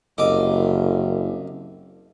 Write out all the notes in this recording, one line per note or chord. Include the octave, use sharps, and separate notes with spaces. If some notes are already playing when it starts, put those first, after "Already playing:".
F#1 C2 D#5 D6